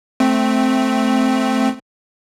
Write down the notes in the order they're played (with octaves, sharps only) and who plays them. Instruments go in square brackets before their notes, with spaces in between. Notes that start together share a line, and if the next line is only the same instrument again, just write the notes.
[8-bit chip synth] A3 C4